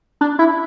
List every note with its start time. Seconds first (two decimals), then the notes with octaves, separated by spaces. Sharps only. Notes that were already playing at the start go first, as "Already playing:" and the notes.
0.21 D4
0.39 E4